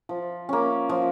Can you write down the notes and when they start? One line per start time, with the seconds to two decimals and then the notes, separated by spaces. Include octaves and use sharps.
0.09 F3
0.49 A#3 C#4
0.89 F3